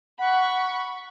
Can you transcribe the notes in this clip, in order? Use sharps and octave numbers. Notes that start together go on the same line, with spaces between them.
F#5 B5 C#6